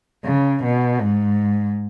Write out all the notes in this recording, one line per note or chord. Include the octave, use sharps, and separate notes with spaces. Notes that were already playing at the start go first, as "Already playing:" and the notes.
C#3
B2
G#2